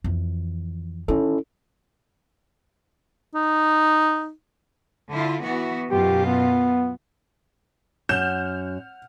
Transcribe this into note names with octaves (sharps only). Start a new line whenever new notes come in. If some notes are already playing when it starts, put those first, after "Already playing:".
F2 E3
D#3 C#4 E4 A4
D#4
D3 E4 F4
E3 B3 F#4
F#2 B2 F4 G4
B3
F#2 F#5 F6 G6 E7